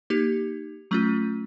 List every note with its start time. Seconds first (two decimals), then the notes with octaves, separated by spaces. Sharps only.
0.10 A#3 D#4 G4
0.91 F#3 A3 C#4 F4